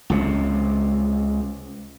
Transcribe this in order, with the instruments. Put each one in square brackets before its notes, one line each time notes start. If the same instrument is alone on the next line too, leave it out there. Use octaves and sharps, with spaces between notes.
[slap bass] C#2 C3